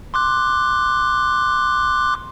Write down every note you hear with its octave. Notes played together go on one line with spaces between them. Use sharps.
C6 D6 F#6